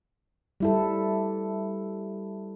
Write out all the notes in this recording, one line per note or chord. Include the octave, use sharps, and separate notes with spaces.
G3 E4 A4